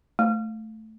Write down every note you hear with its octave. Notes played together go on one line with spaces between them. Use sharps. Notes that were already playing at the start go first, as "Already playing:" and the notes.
A3